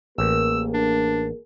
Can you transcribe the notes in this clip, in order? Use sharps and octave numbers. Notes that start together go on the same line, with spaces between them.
A1 A#3 G#4 A#4 E6
D4